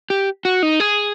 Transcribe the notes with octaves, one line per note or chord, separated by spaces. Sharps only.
G4
F#4
D#4
G#4